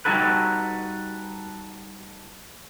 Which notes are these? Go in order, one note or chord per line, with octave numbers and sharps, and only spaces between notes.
G3 D#4 F#4 A4 B4